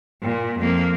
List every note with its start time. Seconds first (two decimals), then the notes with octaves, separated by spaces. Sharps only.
0.24 A#2
0.60 F2 A#3